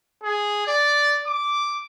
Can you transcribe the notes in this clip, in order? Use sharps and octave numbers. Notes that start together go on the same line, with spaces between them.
G#4
D5
D6